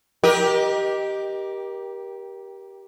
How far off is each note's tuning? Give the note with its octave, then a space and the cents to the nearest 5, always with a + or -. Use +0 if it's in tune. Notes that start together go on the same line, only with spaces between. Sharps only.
G4 -5 A#4 +30 D#5 +0